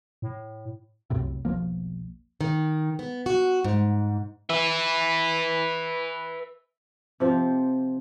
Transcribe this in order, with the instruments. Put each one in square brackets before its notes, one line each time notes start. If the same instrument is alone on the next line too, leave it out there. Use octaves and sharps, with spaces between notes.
[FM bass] A2
[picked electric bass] C2 F#2 A2 C3
E1 B1 F3 A#3
[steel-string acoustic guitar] D#3
B3
F#4
G#2
[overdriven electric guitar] B4 E5
[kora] C3 F3 G4